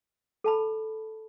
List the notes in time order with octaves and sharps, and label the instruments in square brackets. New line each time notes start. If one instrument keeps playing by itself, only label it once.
[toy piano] A4 A5 B5